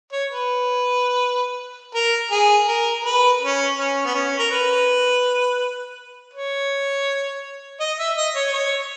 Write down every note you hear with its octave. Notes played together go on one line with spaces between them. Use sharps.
C#5
B4
A#4
G#4
A#4
B4
C#4
C#4
B3
C#4
A#4
B4
C#5
D#5
E5
D#5
C#5
C#5